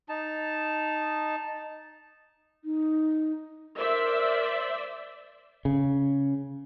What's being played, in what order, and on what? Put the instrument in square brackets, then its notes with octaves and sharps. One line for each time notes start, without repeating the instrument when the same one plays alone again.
[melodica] D#4 A5
[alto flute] D#4
[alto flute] A#4 [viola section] C5 D5 E5
[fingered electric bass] C#3